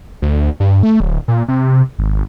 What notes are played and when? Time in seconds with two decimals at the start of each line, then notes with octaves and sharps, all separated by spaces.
0.22 D2
0.60 G2
0.83 A3
1.00 D1
1.28 A#2
1.48 C3
1.99 G#1